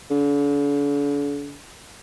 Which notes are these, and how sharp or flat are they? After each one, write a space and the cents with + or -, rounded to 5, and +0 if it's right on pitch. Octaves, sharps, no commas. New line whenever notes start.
D3 -45